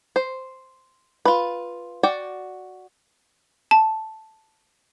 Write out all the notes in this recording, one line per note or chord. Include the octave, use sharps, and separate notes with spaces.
C5
F4 B4
F#4 D5 G5
A5